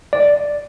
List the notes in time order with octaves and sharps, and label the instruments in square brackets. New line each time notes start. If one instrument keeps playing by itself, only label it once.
[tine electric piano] D5